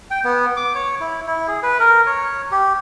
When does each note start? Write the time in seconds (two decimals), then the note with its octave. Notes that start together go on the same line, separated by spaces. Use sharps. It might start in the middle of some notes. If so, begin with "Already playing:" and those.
0.11 G5
0.24 B3
0.57 D6
0.75 C#5
1.00 E4
1.27 E4
1.48 G#4
1.63 B4
1.79 A#4
2.06 C#5
2.51 G4